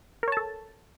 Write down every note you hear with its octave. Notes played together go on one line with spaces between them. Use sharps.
A4 A#4 C#5 A5